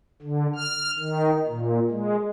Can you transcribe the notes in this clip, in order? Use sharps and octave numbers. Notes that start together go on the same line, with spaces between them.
D3
F6
D#3
A#2
G#3